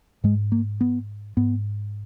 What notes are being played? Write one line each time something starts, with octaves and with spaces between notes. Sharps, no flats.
G#2 G#3
A#3
B3
G#2 B3